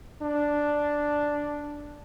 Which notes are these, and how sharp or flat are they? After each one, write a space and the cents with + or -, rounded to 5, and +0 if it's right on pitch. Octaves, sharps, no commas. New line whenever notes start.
D4 +0